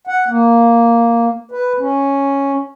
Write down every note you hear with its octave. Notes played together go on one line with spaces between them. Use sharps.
F#5
A#3
B4
C#4